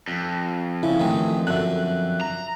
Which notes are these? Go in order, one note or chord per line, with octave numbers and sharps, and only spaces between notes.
F2
C#3 E4
A1 D#3 G#3
F#2 D3 E5 F#6
A#5